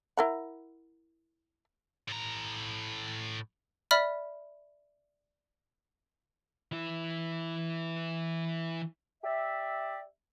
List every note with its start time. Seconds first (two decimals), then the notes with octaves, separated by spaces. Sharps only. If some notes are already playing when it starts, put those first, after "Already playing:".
0.17 E4 A#4 F#5
2.09 A2 A#5
3.91 D5 E5 B5 F6 B6
6.72 E3 E4
9.23 G4 D5 E5